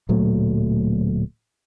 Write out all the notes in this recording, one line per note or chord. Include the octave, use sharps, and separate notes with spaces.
D1 A#2 F#3 A3